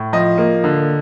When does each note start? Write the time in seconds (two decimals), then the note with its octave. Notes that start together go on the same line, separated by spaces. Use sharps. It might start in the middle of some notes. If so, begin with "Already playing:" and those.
Already playing: A2
0.13 F3 D#5
0.38 A#3
0.64 D3